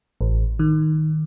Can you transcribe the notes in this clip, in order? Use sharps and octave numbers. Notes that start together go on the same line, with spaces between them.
A1
D#3